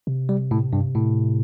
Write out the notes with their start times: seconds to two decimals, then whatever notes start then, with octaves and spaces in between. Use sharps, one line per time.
0.07 C3
0.29 G3
0.51 A2
0.73 G2
0.95 A2